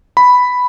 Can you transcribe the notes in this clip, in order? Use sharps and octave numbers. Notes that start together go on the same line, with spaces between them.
B5